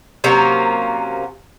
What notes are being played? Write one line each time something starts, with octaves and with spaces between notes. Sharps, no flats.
C3 F#3 A#3 C#4